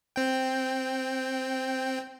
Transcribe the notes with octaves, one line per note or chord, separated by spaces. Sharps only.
C4 G5